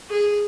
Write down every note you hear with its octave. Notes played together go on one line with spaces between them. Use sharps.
G#4